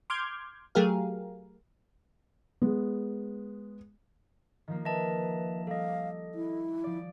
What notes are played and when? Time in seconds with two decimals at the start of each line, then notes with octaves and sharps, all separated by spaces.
0.10 C6 D6 F6 G6 G#6
0.75 F#3 A3 G4 G#4 A#4 F5
2.62 G#3 B3
4.68 D#3 F3 A#3
4.85 B4 D#5 E5 A5
5.67 G3 A4 D#5 F5
6.35 E4
6.84 F3 D5